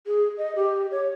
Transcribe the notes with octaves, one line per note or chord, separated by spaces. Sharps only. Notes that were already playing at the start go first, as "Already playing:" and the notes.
G#4
D#5
G4
C#5